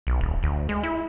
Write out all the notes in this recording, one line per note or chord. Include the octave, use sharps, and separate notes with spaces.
B1
D#1
D2
G#3
E4